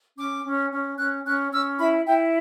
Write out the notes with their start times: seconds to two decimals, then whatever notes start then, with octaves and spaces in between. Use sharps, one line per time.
0.17 C#4 D6
0.44 C#4
0.71 C#4
0.98 C#4 F#6
1.24 C#4 F#6
1.52 C#4 E6
1.78 E4 B5
2.05 E4 G5